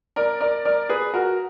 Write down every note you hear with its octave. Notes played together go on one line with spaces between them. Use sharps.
A#4 D5
A#4 D5
A#4 D5
G#4 B4
F#4 A#4